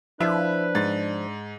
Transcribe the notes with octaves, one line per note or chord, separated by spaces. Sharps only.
F3 D4 E4 B4
G#2 A6